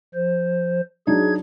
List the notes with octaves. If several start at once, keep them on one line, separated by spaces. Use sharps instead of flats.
F3 C5
F#3 D4 D#4 G#4 G#6